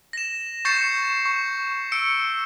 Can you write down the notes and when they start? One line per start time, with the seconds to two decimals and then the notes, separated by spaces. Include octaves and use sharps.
0.13 A#6 E7
0.65 C#6 G6 A6 C7 C#7 E7
1.25 C#6
1.92 E6 C#7 D7